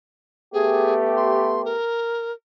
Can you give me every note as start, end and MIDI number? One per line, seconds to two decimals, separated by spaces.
0.53 1.76 57
0.53 1.76 59
0.53 1.76 67
0.53 0.93 68
1.17 1.62 84
1.65 2.32 70